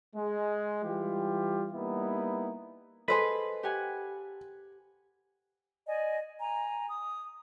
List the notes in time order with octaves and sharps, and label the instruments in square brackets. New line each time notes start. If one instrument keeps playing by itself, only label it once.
[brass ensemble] G#3
E3 G3 F4 G4
G3 A#3 B3 D#4 E4
[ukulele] G#4 C5 D#5 [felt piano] A4 [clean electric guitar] B4
[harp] G4 F#5 G#5
[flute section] D5 D#5 G#5
G#5 A#5
D#6